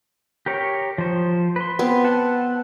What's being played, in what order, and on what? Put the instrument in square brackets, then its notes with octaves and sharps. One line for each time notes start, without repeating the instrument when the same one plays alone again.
[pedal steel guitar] G4 A#4 C#5
F3 C5
B4 C6
[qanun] B3 C4
[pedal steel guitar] F#5 A5